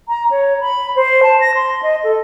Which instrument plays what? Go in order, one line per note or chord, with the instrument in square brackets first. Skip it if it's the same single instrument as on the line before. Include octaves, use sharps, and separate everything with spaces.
[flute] A#5
C#5
B5
C5
A5
A#6
C6
D#5
A4